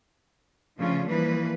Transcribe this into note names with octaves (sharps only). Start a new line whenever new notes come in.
C#3 F3 A3 C#4 D4 F4
E3 F3 G3 A#3 B4